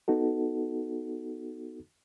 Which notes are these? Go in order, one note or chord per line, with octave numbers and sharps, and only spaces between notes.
B3 D#4 F#4 A4